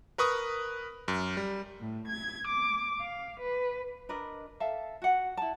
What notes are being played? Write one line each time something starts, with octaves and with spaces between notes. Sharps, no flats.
A#4 B4 C#6 D#6
F#2
G3
A2
G#6
D6
F5
B4
D4 A#4 B4 D#5
A4 E5 F5 A5
F#4 F#5
E4 A5